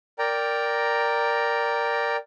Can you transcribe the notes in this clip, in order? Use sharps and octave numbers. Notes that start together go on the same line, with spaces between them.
A#4 D5 G5 A#5